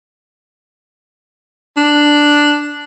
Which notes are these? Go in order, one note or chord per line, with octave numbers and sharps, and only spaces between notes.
D4